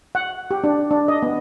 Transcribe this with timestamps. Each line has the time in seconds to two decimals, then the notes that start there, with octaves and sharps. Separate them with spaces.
0.15 F#5
0.51 G4
0.64 D4
0.91 D4
1.08 D#5
1.23 B3